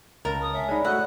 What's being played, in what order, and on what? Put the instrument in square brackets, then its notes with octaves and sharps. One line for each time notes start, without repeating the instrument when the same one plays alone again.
[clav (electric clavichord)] C#2 [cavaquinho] A#4 A5
[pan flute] D#6
[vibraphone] C#5 G#5 [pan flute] E5
[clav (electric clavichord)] G#3 D#4 [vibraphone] C#5 D5 B5
[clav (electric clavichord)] A3 F#4 D#5 [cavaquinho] F#5 [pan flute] F#6